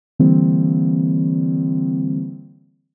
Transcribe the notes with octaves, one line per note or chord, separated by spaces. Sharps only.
D3 E3 G3 A#3 C4